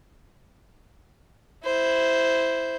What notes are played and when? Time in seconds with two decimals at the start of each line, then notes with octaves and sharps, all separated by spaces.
1.65 E4 C5